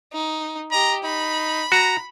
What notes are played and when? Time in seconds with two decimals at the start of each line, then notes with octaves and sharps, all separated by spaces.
0.13 D#4
0.72 G4 D#5 A#5
1.04 D#4 B5
1.72 F#4 A#5